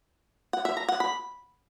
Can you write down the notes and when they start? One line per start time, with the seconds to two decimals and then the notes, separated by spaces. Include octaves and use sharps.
0.53 F#5
0.65 E5
0.77 A#5
0.89 F#5
1.00 B5